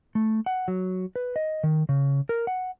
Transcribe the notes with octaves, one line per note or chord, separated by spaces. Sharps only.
A3
F#5
F#3
B4
D#5
D#3
C#3
A#4
F#5